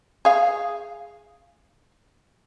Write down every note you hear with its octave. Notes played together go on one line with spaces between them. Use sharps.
G#4 F5